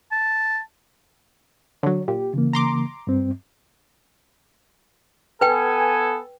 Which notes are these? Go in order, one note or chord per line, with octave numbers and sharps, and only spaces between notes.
A5
D3 F#3 C#5
A#2 G4
C#3 E3 A#3
A#5 C6 D6
G2 C4
B3 A4 B4 G5 G#5